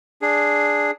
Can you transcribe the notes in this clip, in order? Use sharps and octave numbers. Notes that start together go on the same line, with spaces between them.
D4 G#4